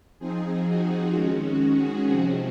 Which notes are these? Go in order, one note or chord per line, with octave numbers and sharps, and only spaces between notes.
F3 C4 D#4 G#4
F#4
D#3 G#3 C#4 F#4
F#4
G#4
C3 F3 C4 F#4